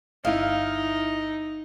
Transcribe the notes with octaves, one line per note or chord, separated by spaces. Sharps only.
G1 D#4 E4 D#5 F5